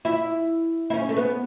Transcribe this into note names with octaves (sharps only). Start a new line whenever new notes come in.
E4
E4
C#4
A3
B3